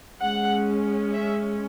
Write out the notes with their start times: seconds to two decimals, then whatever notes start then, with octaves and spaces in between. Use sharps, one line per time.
0.21 G#3 C#4 F#5
1.13 E5